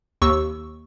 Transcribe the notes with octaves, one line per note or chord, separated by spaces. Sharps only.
D#2 C#6 E6